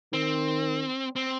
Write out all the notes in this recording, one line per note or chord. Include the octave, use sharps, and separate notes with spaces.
D#3 C4
C4